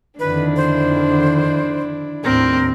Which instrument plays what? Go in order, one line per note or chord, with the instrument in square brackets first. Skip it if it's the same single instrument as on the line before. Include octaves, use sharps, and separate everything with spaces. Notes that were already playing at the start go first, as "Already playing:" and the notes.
[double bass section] F2 D3 D#3 [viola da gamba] D4 E4 [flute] B4
[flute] C5
[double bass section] D#2 A2 [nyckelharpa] C4 [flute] A#4